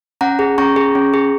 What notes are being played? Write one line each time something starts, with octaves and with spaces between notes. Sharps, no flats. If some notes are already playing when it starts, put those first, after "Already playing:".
C#4 F#5 A#5
G#4
C#4 A#5 C#6
G#4
C#4
G#4